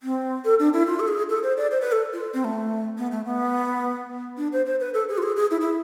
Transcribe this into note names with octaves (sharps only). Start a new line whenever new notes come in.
C4
A4
D4
E4
F4
A4
G#4
A4
C5
D5
C5
B4
A4
F4
C4
A3
B3
A3
B3
D4
C5
C5
B4
A4
G#4
F4
G#4
G#4
E4
E4